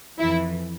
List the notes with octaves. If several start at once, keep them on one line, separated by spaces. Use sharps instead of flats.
F2 E3 E4